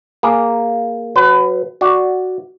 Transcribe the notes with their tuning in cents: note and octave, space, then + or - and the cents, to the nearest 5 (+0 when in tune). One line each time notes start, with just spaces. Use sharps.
A#3 +0 G#4 +0
F#3 +0 B4 +30
F#4 +0 D5 +0